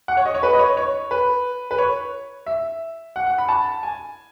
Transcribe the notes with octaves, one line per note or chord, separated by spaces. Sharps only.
F#5
C#5
D#5
C#5
B4
D#5
C#5
C#5
B4
B4
C#5
E5
F#5
F#5
B5
A5
G#5